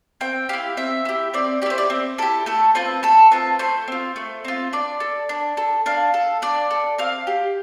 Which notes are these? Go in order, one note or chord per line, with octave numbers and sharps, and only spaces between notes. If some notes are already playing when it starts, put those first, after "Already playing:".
C4 G5
E4 G4 F5
C4 E5
E4 G4
C4 D5
E4 G4 C5 D5
D5
C4
E4 G4 A4
A3 A4
C4 F4 B4
A3 A4
C4 F4 B4
A3 C5
C4 F4
A3
C4 F4
D4 D5
A4
D4
A4
D4 F5
A4
D4 D5
A4
C4 F5
G4